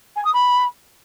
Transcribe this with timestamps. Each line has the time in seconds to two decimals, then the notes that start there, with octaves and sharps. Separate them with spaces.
0.16 G#5
0.25 D#6
0.33 B5